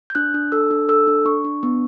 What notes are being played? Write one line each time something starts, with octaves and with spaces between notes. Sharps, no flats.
G6
D4 F#6
D4
A4 E6
D4
A4 E6
D4
D4 C#6
D4
B3